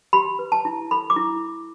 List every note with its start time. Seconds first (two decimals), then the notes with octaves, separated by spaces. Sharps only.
0.13 G4 B5
0.39 B4
0.52 A5
0.65 E4
0.91 A4 B5
1.10 D6
1.16 E4